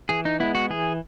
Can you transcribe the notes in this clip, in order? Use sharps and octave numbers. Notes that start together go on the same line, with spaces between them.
E3 G#4
D#4
G#3 B3 E4
F#4
E3 G#4